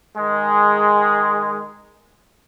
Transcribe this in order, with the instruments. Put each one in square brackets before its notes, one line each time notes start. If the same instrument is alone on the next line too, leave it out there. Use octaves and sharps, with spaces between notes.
[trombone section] D#3 G#3